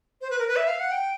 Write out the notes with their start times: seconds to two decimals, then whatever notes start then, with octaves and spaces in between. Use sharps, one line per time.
0.21 C5
0.30 B4
0.39 A#4
0.47 B4
0.56 E5
0.68 F5
0.80 F#5
0.92 G5